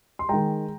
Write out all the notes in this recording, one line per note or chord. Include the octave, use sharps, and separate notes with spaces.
C6
D#3 G#3 G5 A#5